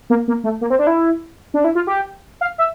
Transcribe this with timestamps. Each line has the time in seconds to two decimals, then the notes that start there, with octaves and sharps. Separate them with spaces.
0.10 A#3
0.28 A#3
0.44 A3
0.61 A#3
0.70 C4
0.79 D4
0.87 E4
1.54 D4
1.64 E4
1.75 F4
1.87 G4
2.41 F5
2.58 E5